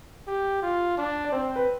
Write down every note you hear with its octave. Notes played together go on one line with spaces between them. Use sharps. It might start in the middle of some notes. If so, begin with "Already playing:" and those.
G4
F4
D4
D5
C4 C5
B4